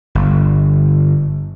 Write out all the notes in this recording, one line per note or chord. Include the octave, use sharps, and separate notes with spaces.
G1